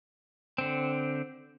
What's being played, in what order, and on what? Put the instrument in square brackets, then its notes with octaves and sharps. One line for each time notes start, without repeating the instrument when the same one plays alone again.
[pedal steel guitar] D3 C4